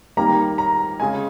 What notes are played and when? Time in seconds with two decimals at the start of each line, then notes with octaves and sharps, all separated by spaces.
0.17 D#3 G3 A#3 A#5
0.58 A#5
1.00 C#3 G#3 G#5